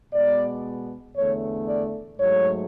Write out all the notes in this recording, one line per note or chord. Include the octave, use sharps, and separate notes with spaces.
B2 G#3 B3 D5
E2 D3 A3 C#5
D5
G#2 F#3 A3 C#5